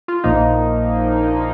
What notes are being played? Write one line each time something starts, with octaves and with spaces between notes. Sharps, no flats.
F4
A#1 A#2 F3 A#3 D#4